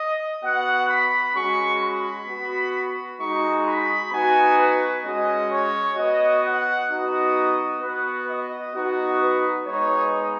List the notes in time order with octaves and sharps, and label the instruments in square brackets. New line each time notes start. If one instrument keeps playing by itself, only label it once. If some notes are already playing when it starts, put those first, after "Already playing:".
Already playing: [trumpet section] D#5
B3 F#4 F#5
B5
G#3 C#4 F#4 C#6
B5
B3 F#4
G#3 D#4 F#4 C#6
B5
B3 D#4 F#4 G#5
B4
G#3 C#4 F#4 D#5
C#5
B3 F#4 D#5
F#5
B3 D#4 F#4 D#5
B3 F#4 B4
D#5
B3 D#4 F#4
B4
G#3 B3 D#4 C#5